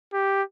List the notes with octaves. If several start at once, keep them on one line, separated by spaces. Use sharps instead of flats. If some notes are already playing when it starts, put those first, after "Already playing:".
G4